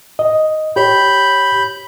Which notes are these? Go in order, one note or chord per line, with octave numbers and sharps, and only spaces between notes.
D#5
G4 C#5 B5 G6